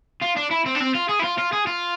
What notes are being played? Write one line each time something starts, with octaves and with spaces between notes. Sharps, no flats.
F4
D4
E4
C4
D4
C4
F4
G#4
E4
F4
F4
G#4
F4